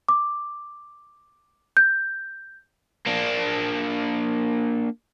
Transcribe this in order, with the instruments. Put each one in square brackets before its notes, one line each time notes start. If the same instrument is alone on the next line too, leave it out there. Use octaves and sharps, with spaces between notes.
[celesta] D6
G6
[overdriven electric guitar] A#3 D4